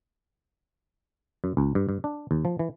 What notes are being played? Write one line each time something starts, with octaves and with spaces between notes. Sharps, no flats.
F#2
C#2
G2
G2
D4
D#2
F3
E3